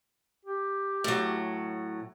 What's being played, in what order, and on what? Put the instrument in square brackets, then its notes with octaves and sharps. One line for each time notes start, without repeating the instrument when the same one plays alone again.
[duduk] G4
[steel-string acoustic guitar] A2 F#3